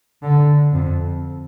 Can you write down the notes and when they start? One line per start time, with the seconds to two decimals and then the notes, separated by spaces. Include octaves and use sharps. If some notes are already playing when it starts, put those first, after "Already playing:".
0.23 D3
0.73 F2